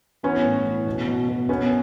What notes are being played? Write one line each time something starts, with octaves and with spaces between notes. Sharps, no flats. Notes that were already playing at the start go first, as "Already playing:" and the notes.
E3 B3 C#4
A2
E3
B2
B2
B2
B2 B3 C#4